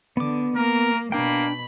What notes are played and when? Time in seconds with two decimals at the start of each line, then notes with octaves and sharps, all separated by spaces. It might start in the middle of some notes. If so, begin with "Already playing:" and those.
0.17 D3 B3 D6
0.56 A#3 A#4
1.12 B2 A#3 D4 G5 B5